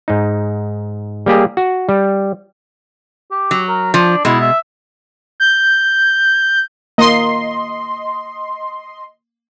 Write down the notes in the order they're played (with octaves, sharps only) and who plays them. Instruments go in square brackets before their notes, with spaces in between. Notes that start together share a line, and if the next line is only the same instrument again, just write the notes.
[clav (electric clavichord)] G#2 D#4
G3 A#3 G4 G#4
F#4
G3
[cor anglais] G4
[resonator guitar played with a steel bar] F#3
[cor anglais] A#4
[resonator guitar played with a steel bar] F3 [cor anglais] D4
[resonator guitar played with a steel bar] B2 G#3 [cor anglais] E4
[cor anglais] E5
[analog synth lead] G6
[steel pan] A#3 [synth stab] D#5 C6